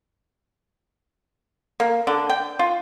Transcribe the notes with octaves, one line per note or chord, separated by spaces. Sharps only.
A#3
D3
G5
F4